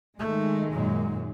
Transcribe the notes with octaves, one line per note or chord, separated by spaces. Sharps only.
D#3 G#3 A3
F#2 A#2